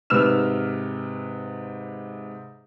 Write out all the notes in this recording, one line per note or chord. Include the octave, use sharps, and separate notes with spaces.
G#2 C3 B4 E6 F6 E7